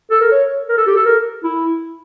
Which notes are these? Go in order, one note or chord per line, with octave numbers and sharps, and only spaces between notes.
A4
A#4
C#5
A#4
A4
G4
A4
A#4
E4